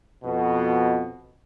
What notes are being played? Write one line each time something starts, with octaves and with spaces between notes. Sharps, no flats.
F2 B2